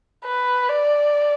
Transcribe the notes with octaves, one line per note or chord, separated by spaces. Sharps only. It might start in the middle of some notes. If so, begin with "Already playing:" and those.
B4
D5